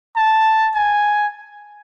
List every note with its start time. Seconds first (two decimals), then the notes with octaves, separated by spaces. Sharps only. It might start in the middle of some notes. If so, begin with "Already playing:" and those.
0.16 A5
0.75 G#5